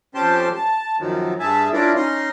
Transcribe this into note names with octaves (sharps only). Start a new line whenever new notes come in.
F2 C#4 G4 C5 A5 C6
A5
F#2 D#3 F3 F#3
G2 G#4 E5 A5
C#4 D4 E4 F4 A#4 D5
C#4 D#4 A#5 C6